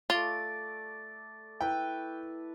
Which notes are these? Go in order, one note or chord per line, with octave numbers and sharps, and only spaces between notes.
A3 F4 D5 A6
E4 B4 G5